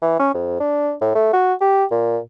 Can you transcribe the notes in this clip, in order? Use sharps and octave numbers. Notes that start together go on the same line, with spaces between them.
E3
C#4
F2
D4
A2
A3
F#4
G4
A#2